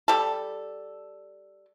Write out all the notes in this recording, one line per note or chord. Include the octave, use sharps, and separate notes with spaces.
G3 A4